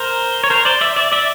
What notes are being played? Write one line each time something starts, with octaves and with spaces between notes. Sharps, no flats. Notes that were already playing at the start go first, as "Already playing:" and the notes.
Already playing: A#4 C5
C#5
A#4 C5
C5 D5
D5 E5
D5 E5
D5 E5